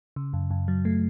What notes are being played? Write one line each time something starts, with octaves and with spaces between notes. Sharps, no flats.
C#3
F#2
F#2
F#3
A3